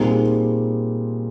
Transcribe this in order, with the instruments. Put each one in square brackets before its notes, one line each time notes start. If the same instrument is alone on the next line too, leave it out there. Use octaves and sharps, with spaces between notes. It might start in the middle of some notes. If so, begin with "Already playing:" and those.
Already playing: [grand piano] A#2 G3 C4 D#4 G#4